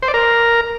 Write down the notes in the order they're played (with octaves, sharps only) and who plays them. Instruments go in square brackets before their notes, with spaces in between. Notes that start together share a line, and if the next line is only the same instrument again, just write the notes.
[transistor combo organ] C5
D5
A#4